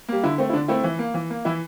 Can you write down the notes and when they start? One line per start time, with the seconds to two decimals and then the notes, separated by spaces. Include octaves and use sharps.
0.08 G3 A#3
0.24 D3 E4
0.38 A3 C4
0.50 E4
0.53 D3 D4
0.68 A3 C4 E4
0.84 E3
0.99 A#3
1.14 E3
1.30 A#3
1.45 E3 E4